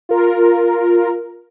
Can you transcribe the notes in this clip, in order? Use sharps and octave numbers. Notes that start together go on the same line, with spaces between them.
F4 A#4